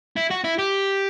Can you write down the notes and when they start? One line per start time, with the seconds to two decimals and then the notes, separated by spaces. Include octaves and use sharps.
0.17 E4
0.31 F#4
0.44 E4
0.59 G4